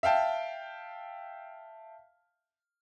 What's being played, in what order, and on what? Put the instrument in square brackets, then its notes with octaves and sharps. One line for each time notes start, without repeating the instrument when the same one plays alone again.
[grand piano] E5 F5 G5 A5